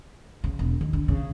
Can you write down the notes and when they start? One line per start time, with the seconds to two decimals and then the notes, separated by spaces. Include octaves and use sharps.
0.44 C#3
0.59 E1
0.81 D#2
0.93 D3
1.08 C#3